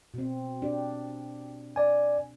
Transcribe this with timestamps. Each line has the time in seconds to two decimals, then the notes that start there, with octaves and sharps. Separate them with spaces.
0.14 B2 C4
0.62 D4 G4
1.76 D5 G#5